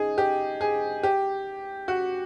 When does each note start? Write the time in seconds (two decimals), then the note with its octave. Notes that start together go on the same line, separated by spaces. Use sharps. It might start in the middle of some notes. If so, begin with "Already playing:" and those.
Already playing: D#4 G#4
0.18 G4
0.61 G#4
1.03 G4
1.88 F#4